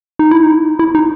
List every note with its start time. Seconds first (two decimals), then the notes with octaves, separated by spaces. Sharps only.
0.19 D#4
0.31 E4
0.43 D#4
0.79 E4
0.95 D#4